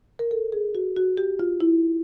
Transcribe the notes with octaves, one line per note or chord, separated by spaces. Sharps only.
A#4
A4
G#4
F#4
F#4
G4
F4
E4